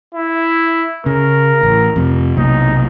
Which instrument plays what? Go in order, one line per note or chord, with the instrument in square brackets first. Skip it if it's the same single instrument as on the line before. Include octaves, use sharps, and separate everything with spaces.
[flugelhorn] E4
[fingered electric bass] C#3 [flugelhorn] A#4
[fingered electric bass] A1
F2 C3
[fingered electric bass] B1 C3 A#3 [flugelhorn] D#4